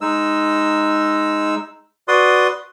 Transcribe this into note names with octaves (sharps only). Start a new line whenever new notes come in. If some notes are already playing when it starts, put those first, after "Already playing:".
G#3 D#4 E6
F#4 B4 D5 C6 D#6